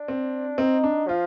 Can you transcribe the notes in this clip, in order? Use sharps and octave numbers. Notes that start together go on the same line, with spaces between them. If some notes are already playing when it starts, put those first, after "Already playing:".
Already playing: D4
C4
C4 D#4
D4
F3 F4